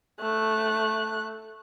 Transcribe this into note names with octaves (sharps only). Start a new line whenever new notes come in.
A3 F#6